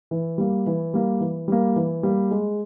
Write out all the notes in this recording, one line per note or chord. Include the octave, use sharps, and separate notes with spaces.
E3
G3 A#3
E3
G3 A#3
E3
G3 A#3
E3
G3 A#3
G#3